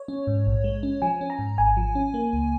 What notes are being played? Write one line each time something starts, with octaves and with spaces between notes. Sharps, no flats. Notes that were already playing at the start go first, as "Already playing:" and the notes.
Already playing: C#5
C#4
G#2
A#1
G#3
C#4
F3 G#5
C#4
A#5
G#2
G#1 G#5
F3
C#4
A#3
C#2